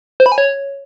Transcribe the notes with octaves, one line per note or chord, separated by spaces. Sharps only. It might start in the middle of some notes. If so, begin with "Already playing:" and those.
C5
B5
G#5
C#5